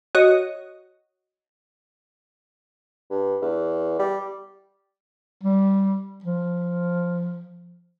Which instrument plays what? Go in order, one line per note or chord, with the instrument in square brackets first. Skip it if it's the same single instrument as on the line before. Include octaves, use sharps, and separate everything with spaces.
[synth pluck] F#4 C#5 D#5
[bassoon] G2
E2
G3
[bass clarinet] G3
F3